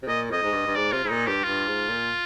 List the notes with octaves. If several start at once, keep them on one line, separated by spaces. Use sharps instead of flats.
C3
A#2 D#5
F2 D#5
G#2
G2
G2
G#2 D5
C3 F4
G#2
A#2 D#4
G2 G4
G2 F4
G#2
A#2